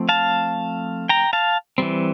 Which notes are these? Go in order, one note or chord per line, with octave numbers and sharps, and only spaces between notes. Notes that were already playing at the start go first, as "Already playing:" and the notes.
Already playing: F3 A3 C4
F5 A5
G5 A#5
F5 A5
E3 G3 C4